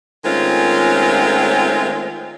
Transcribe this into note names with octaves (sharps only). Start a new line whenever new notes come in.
D#3 G#3 A3 C4 C#4 F4